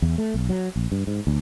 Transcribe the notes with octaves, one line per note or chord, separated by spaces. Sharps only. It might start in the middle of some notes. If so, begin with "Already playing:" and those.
E2
A3
B1
F#3
A#1
G2
G#2
D2